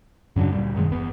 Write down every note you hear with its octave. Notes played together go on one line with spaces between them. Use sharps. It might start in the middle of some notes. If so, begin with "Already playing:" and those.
F#2 C#3 F#3 D4
D2 A#2 G3
F#2 B2 D#3 G#3
F#1 E2 B3